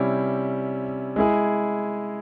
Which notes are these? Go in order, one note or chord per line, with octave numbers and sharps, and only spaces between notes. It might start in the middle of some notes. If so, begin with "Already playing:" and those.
Already playing: C3 G3 C#4 E4
G#3 E4 G#4